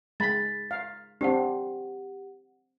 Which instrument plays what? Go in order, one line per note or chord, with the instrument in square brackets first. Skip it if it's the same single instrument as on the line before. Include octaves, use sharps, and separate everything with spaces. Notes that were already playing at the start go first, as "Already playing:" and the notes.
[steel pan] G#3 B5 [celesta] A6 B6
[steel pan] F5
[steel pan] C4 D4 [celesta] G4 F#5